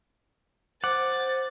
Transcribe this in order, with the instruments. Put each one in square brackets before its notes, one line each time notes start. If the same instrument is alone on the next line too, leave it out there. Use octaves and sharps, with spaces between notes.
[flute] C5 [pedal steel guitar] F#5 [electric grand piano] D6 [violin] A6